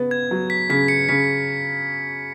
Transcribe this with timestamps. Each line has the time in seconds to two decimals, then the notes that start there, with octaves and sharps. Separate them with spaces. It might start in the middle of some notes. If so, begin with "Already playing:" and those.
Already playing: C#3 B3
0.11 G#6
0.31 F#3
0.50 B6
0.69 C#3 B6
0.88 C#7
1.09 C#3 B6